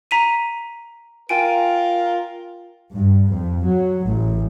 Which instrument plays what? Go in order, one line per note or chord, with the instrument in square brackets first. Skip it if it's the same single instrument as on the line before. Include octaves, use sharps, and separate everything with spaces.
[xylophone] A#5 B6 D#7
[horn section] F4 A#4 [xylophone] G5 G#5 D7
[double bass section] G2
F2
F#3
A1